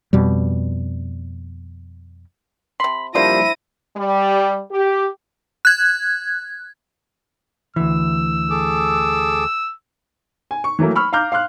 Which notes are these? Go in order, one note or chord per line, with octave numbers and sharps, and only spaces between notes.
F2 B2 G3
C3 B5 C6
F3 G3 A#3 D4 E4 C5 A#6 D#7
G3
G4
F#6 G#6
D2 E3 E6
G#4 A4 D6
G#5
C#6
E3 F#3 A3 A#3
B5 C#6 E6 F6
F5 A#5 D6 F6 G6
F5 C6 F6 F#6